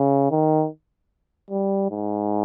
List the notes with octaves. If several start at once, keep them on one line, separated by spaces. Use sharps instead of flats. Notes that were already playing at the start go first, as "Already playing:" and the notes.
Already playing: C#3
D#3
G3
G#2